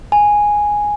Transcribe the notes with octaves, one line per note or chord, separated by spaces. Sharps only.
G#5